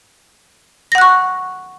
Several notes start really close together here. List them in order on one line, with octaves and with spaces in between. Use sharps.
A#6 F#5 F#6 C#6